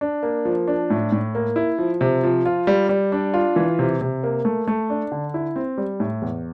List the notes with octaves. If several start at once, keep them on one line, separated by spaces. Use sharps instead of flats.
D4
A#3
F3
D4
A2
A2
A#3
E4
F3
C3
F3
F4
G3
G3
D4
F4
E3
C3
C3
A#3
A3
A3
D4
D3
E4
C4
G3
A2
E2